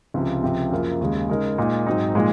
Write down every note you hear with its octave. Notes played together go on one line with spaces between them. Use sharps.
C#2 C3 F3
C#2 C3 F3 C4
F#2 C#3 F3 A#3 F4
D#2 C#3 G#3
C#3 G#3 D#4 A#4
A#2 G#3 D#4
G#2 F#3 C4 D#4
A#2 F3 G#3 D#4